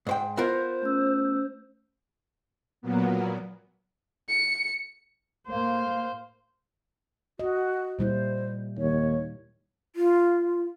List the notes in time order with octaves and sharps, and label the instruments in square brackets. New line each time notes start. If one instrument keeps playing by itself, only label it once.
[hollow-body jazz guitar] G#2 C5 G5
[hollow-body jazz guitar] B3 F4 A#4 [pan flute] C5
[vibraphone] A3 C#4 E6
[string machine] A#2 F#3 A#3 B3
[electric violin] C#7
[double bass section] A2 A#3 [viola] C5 [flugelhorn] F5
[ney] F#4 [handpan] D#5
[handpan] A#2 G3 E4 [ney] C5
[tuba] D#2 [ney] C#5
[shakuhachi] F4